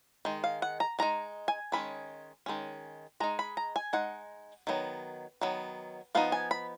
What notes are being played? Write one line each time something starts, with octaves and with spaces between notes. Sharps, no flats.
D#3 G#3
F5
F#5
A#5
D#3 G#3 D#4 A#5
G#5
D#3 G#3 C#4 B5
D#3 G#3 C#4
G#3 D#4 A#5
B5
A#5
G#5
G#3 D#4 F#5
D#3 F#3 B3
D#3 F#3 B3
F3 B3 D#4 F5
G#5
B5